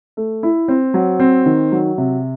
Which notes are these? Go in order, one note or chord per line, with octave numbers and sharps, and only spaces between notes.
A3
E4
C4
F#3
C4
D#3
F#3
C3